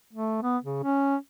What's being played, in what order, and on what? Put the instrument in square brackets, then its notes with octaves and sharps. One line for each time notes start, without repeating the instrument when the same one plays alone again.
[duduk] A3
B3
C#3
C#4